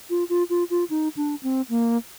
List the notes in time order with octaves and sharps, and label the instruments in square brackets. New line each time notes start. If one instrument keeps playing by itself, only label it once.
[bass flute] F4
F4
F4
F4
D#4
D4
C4
A#3